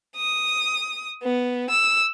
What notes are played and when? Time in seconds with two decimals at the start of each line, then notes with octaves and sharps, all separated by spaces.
0.16 D#6
1.23 B3
1.70 E6